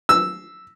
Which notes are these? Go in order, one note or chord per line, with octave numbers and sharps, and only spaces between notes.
E6